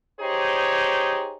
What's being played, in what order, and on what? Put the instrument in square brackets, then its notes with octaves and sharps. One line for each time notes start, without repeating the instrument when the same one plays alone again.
[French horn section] D#4 G4 G#4 C5 C#5